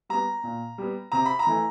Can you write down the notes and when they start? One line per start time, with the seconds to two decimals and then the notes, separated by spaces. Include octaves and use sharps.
0.09 G3 B3 A#5
0.43 A#2
0.78 G3 B3
1.12 C3 A#5
1.25 B5
1.39 A#5
1.47 E3 A3